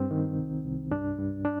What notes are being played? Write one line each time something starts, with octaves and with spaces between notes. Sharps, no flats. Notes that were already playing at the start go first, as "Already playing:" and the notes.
Already playing: G2 C4
D#3
C2
C2
G2 D4
G2
D4